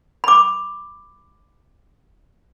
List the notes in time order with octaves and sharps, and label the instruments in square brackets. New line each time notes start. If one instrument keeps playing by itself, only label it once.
[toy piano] B5 D6